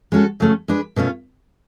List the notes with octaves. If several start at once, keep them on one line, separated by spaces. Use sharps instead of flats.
G#3 C#4 F#4 A4
C#3 F#3 A3 C#4
G#3 D4 G#4 B4
B2 A3 C#4 F4